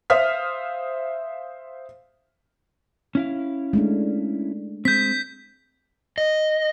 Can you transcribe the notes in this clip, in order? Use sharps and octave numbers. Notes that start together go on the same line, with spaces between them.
C5 E5 F5 D#6 F6 B6
C#4 E4 F5
G#3 A3 D4
G#3 C4 G6 B6
D#5